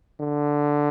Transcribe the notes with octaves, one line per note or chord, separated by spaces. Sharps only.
D3